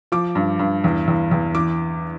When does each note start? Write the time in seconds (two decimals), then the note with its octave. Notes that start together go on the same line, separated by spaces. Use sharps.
0.12 F3 D6
0.35 G2
0.59 G2
0.84 E2
1.08 E2
1.31 E2
1.55 E3 D6